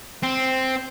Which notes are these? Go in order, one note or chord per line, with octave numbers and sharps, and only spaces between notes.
C4